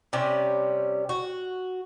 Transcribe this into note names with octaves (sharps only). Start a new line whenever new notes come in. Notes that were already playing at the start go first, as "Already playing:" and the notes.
C3 G3 C#4
F#4